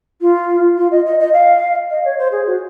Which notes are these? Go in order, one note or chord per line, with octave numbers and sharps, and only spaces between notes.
F4
F4
D#5
D#5
D#5
F5
D#5
C#5
C5
G#4
F#4